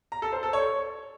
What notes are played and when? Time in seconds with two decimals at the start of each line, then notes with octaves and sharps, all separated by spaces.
0.12 A#5
0.22 A4
0.33 C5
0.43 A4
0.53 C#5